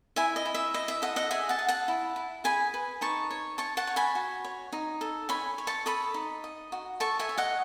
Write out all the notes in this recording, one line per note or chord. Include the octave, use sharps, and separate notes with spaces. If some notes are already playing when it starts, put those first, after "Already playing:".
E4 E5 G#5
D#5
E4
E5
E4 D#5
E5
A4 D#5 F#5
D#5 F#5
G#4 E5 G#5
F#5 A5
G#4
F#5 A5
E4
E4
G#4 G#5 B5
B4
D#4 A5 C#6
C#5
C#5 A5 C#6
F#5 A5
C#5
G#5 B5
F#4
C#5
D#4
A4
C#5 G#5 B5
C#5
A5 C#6
A4 B5 D#6
D#4
D#5
F#4
A4 A5 C#6
E5 G#5
C#5
D#5 F#5